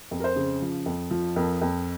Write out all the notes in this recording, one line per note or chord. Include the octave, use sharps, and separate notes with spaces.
F2
A#4
C5
C#3
F3
F2
F3
F2 A#4
F2